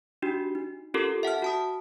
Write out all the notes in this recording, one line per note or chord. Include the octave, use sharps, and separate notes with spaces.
D4 D#4 F#4 G4
D#4
C#4 F4 G4 A4 A#4
E5 F#5 A5 F6
F#4 A5 D#6